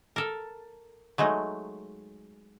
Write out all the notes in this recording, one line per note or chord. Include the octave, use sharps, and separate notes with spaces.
A4 A#4
F#3 G#3 A3 D#4